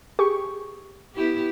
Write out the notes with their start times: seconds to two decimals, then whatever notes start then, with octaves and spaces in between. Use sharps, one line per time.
0.19 G4 G#4 C#6
1.14 B3 E4 G4